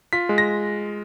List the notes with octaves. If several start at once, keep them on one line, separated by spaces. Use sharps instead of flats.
F4 B6
G#3
A#6